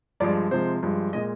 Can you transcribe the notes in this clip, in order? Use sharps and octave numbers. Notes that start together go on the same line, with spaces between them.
G2 F3 G#3 D5
C3 F3 G#3 C5
G2 F3 G#3
A#2 G#3 D#5